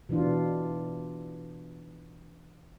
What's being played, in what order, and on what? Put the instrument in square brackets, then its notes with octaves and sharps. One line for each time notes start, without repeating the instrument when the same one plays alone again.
[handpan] B2 E3 D4 F4